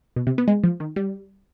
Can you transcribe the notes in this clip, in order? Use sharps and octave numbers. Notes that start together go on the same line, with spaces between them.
B2
C3
B3
G#3
F3
D#3
G3